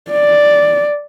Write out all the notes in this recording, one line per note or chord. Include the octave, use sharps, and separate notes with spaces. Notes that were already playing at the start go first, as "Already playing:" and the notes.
D5